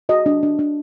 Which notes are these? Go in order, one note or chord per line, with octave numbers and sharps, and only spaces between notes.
F#4 D#5
D4
D4
D4